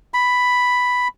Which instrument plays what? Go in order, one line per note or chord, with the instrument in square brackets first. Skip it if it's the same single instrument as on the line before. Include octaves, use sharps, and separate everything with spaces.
[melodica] B5